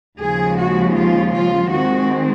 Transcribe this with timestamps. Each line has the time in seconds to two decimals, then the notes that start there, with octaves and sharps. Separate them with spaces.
0.19 D#2 C#3 F3 G#3 G#4
0.58 F#4
0.95 F4
1.33 F4
1.70 D#3 G#3 C4 F#4